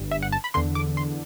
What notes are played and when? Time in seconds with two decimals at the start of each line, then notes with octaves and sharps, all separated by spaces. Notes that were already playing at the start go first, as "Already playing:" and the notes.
Already playing: G1 G2
0.11 E5
0.22 F#5
0.32 A5
0.44 B5
0.54 E2 D3 C6
0.75 D6
0.97 C6